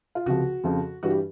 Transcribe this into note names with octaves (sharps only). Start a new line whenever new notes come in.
F4
C#2 C3 F3 F#4
F2 C#3 F3
G2 E3 G3 F#4
G4